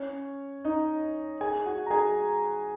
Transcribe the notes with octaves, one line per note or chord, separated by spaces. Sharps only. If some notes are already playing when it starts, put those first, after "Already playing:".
Already playing: C#4 C#5
D#4 D#5
G#4 G#5
F#4 F#5
A#5
G#4 G#5